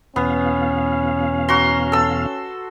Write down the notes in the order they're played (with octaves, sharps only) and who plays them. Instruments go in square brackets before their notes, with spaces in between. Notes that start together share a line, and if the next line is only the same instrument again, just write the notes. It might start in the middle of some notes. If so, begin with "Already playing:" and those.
[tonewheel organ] E2 B2 F5 [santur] B3 [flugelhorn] C#4
[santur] F#4 A#5 C6
A4 E6